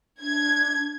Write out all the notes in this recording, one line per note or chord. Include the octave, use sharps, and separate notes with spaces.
D4 G#6